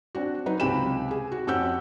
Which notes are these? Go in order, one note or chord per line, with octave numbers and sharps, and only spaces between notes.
C4 D4 F#4
F#3 D#4 B4
C#2 C3 C4 G4 B5 E7
G#4
F#4
F2 C#4 G4 F#5 E6 G6